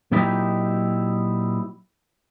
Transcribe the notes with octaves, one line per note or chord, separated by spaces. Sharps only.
A#2 F#3 C4 D#4 E4 G4